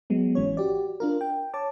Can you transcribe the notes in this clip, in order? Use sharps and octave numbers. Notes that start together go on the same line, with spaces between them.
F#3 G#3 B3
G#1 E3 C#4 C#5
F#4 G4 D5
D4 F4 A#4
G5
C#5 A5 D6